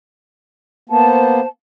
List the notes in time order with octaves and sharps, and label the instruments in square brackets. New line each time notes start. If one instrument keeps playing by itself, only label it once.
[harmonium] A#3 B3 [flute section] C5 A5